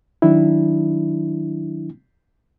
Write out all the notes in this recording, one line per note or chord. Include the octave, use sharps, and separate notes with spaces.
D#3 F#3 D4 E4